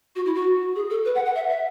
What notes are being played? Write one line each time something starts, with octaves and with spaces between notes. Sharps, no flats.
F#4
E4
F#4
G#4
A4
B4
F#5
F#5
E5
E5